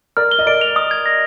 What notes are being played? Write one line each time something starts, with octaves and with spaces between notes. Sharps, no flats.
A#4 D5 F6
G7
D#5
A#4 D5 D7
F7
D#6
G#6
A#6